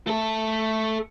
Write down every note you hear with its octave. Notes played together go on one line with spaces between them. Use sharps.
A3 A4